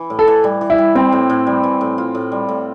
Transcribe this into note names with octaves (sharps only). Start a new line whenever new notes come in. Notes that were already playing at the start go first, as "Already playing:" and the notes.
Already playing: E3
A2
A4
E3
G3
E3
E4
G3
G3 C4
A2
A2
G3
E3
A2
F4
A2
G3
A2